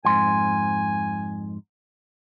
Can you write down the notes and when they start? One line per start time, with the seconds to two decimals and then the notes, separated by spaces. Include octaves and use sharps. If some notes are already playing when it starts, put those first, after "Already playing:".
0.05 F2 G#2 G#5 C6